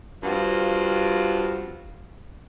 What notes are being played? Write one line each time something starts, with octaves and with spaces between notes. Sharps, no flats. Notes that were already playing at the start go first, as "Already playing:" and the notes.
G2 F3 C4 F4 F#4